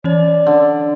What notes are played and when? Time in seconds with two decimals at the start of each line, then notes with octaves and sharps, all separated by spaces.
0.04 E3 C#4 C#5 D5
0.46 D3